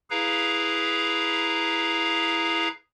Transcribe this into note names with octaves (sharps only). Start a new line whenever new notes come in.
E4 G#4 B4 F5 A#5